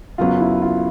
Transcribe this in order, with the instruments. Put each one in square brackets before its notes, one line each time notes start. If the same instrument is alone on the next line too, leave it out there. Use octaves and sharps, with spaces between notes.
[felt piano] F#2 C#3 F#3 B3 [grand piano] F4
[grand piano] E4
F4